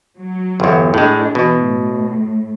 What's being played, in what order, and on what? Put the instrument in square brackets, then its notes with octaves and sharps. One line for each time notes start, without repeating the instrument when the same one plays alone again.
[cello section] F#3
[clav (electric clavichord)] G1 E2
[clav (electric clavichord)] A2 G#3 [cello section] D4
[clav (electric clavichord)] B2 [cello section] E3
[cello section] A2